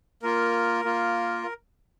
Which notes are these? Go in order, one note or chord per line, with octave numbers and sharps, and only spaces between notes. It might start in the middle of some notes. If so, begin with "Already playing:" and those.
A#3 F4 A#4
A#3 F4